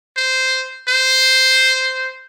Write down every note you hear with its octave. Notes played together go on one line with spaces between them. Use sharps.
C5
C5